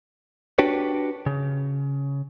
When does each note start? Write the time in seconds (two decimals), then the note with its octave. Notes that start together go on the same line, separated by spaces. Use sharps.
0.59 D4 F#4 G4 B4 C#5
1.26 C#3